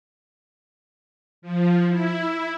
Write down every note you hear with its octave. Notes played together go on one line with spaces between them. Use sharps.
F3
E4